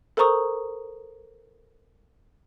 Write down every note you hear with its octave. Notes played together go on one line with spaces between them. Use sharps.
A4 A#4 C5 A#5 C#6 D#6